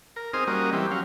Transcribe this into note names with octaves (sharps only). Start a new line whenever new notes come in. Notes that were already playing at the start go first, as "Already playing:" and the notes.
A#4
C4 D#4 G#4 C5 D#6 F6
G3 A#3 C#4 F#4 A#4 D#5
E3 G3 C4 G4
F#3 C#4 F5